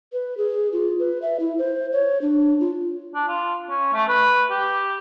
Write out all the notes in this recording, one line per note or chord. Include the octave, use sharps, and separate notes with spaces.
B4
G#4
F4
B4
E5
E4
C5
C#5
D4
F4
D4
F4
C#4
A3
B4
G4